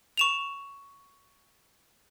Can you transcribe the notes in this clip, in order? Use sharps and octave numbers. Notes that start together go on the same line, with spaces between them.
C#6 E7 F7